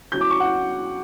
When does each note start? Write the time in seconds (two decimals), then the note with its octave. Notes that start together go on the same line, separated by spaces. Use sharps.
0.12 F#3 C#4 E4 G6
0.21 D6
0.30 C#6
0.40 F#5